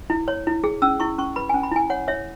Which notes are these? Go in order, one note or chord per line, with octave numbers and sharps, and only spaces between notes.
E4
C#5
E4
G#4
C#4 E6
E4 C#6
C#4 C#6
B4 B5
G#5
C#4
B5
E4 G#5
C#5 F#5
C#5 E5